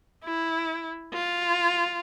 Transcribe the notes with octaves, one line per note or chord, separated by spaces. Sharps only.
E4
F4